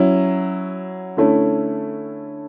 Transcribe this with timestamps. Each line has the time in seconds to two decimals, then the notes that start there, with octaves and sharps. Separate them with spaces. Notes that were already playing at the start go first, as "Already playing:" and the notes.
Already playing: F#3 C#4 E4
1.17 D3 A3 C#4 E4